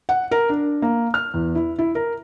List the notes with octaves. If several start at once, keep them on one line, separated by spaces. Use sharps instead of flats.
F#5
A#4
D4
A#3
F6
E2
E4
E4
A#4